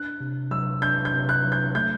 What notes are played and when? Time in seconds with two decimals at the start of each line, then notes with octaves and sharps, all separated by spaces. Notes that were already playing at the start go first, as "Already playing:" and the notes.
Already playing: D4 F#6
0.21 C3
0.51 F#3 E6
0.82 D4 G6
1.05 G6
1.14 C3
1.29 F#6
1.45 F#3
1.52 G6
1.75 A3 G6